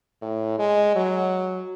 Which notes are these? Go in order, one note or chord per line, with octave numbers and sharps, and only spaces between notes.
A2
G#3
F#3